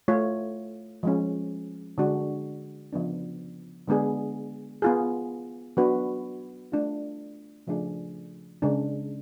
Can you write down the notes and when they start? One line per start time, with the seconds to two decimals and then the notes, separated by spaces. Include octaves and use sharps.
0.08 A3 F4 A4 C#5
1.03 F3 G#3 C#4
1.98 D3 G#3 D4 F#4
2.93 C#3 F3 B3 D4
3.88 D3 G#3 B3 D4 G#4
4.82 B3 F4 G#4
5.77 F#3 B3 D4 F#4 B4
6.72 A3 D4 F4
7.67 C#3 F3 A3 D4 G#4
8.62 C#3 G#3 D4